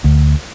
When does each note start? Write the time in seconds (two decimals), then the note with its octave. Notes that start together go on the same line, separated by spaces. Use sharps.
0.04 D2